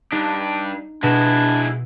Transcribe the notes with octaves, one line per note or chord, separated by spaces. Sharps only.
G2 D4 D#4
B2 G#3 D4 E4 A#6